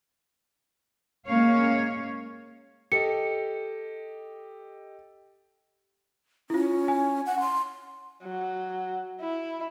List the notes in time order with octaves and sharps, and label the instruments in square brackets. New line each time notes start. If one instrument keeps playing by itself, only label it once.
[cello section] G#3 A#3 C#4 C#5 F5
[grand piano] G4 A4 D#5 [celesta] C#7
[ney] C#4 [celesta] E4 F4
[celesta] G#5
[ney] F#5
C6
[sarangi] F#3
E4